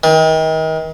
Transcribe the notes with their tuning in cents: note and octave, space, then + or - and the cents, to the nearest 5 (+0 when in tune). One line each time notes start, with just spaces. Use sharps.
D#3 +35